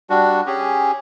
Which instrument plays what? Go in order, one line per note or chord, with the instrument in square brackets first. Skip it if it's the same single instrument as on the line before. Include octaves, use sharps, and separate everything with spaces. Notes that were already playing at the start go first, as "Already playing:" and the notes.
[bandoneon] G3 D4 F#4
C#4 G4 G#4